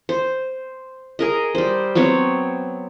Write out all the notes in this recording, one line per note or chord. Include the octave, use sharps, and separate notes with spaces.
C5
G#4 A#4 D#5
G3 C5
F#3 B3 C4 C#5